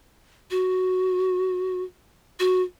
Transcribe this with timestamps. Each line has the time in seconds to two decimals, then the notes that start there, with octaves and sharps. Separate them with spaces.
0.51 F#4
2.40 F#4